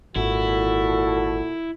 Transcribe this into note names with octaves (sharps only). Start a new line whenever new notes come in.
G#1 A#2 E4 F#4 A4